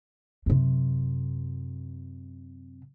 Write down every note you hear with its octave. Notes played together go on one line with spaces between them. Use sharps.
F#2 C3